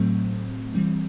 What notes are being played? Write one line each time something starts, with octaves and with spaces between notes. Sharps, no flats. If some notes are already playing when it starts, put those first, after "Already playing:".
Already playing: A2 F#3 A3 C4
E3 G3 C4